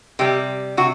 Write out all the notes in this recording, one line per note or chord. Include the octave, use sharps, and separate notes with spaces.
C3 G3 G4
C3 F#4